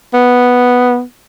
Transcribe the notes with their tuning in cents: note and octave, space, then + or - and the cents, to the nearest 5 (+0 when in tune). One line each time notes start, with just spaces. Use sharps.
B3 +0